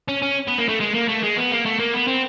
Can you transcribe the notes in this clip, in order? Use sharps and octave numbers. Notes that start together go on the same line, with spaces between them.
C#4
C#4
B3
A#3
A3
G#3
A#3
A3
G#3
B3
A#3
A3
A#3
B3
C4